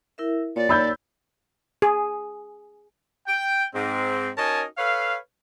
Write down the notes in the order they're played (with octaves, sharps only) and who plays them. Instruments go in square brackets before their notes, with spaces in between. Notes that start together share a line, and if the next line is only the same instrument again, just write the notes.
[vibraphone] E4 A#4 E5
[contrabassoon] A#2 [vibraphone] C#5 [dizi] D5
[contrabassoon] D#2 [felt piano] B5 E6 G6
[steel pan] G#4
[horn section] G5
G#2 C4
C#4 D#4 F#4 A#4 G#5 A5
A4 B4 C#5 F5